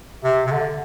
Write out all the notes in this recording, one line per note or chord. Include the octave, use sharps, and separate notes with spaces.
C3
C3
D3